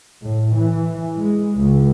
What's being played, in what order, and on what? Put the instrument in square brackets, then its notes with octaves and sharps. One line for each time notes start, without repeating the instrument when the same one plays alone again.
[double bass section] A2
E3
G#3
C#2